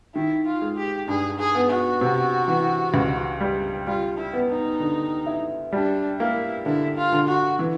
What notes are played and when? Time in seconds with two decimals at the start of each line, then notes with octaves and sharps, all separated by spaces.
0.15 D#3 E4
0.46 F4
0.62 G#3
0.78 G4
1.08 G2 G#4
1.39 G#4
1.55 B3
1.70 F#4
2.01 C3
2.48 E3
2.94 C#2
3.40 G3
3.87 G3 F4
4.18 E4
4.33 B3
4.49 D#4
4.80 D3
5.26 E4
5.72 G3 D4
6.19 A#3 E4
6.66 D3 E4
6.97 F4
7.12 D3
7.28 F#4
7.59 E3